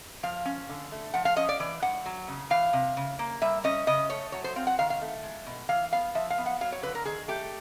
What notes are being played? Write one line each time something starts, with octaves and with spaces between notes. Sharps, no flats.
F3 F5
C#4
D3
A3
F3 F#5
F5
C#4 D#5
D5
E3 D5
G2 F#5
F#3
C#3
E3 F5
C3
C#3
A#3
G3 E5
C#4 D#5
C#3 D#5
A3 C#5
F#3 C#5
C5
C4 F5
F#5
D#3 F5
F5
A3
G#3
B2
E3 F5
B3 F5
F3 E5
F5
B3
F#5
F#3 F5
C#5
D3 B4
A#4
D#3 G#4
A3 G4